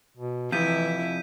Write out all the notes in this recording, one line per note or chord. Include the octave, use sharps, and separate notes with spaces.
B2
F2 C3 E3 E4 G6 B6 D#7